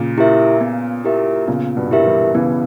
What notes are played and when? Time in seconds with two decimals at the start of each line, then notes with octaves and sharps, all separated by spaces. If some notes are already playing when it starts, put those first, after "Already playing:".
Already playing: A#2 C#3
0.18 E4 G4 A#4 E5
0.61 B3
1.04 E4 G4 A#4 E5
1.47 A#2 C#3 B3
1.76 G2 B2
1.91 E4 G4 A#4 E5
2.06 E3 G3
2.35 C#3 E3 B3